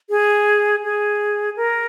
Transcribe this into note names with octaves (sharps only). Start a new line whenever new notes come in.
G#4
G#4
A#4